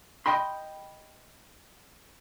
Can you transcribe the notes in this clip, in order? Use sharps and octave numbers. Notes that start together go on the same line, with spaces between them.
D#5 G5 B5 C6